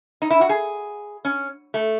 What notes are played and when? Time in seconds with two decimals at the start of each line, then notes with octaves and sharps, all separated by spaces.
0.22 D#4
0.31 E4
0.41 F#4
0.49 G#4
1.25 C#4
1.74 A3